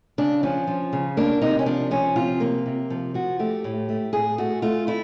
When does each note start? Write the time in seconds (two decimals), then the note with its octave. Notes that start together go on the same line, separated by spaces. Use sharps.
0.18 C#3 D4
0.43 F3 C#4
0.67 F3
0.93 C#3
1.17 A#3 D4
1.42 C3 D#4
1.59 C#4
1.66 F3 D4
1.91 F3 C#4
2.16 C3 F4
2.40 A#3
2.66 C3
2.90 F3
3.14 F3 F#4
3.39 A3 G4
3.64 A2
3.89 A3
4.13 A2 G#4
4.38 A3 F#4
4.62 A3 F4
4.87 A3 E4